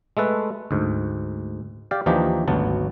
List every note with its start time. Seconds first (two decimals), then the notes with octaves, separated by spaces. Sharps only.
0.17 G#3 A3 A4 B4
0.71 D2 G#2
1.91 G4 D5 F5
2.06 D#2 E3 F3 D4 D#4 G4
2.48 G#1 D2 F#3 B3 A5